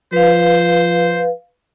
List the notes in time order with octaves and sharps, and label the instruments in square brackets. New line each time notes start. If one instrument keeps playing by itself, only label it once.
[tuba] F3 [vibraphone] B4 F5 [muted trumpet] C5